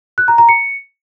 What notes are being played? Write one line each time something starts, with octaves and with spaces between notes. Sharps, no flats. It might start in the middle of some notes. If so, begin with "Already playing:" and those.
F#6
A#5
A#5
C#7